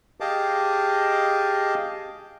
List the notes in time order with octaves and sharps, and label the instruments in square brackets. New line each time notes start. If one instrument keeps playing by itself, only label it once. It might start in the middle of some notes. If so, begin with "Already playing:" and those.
[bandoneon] G4 G#4 D#5 F5 A5 D6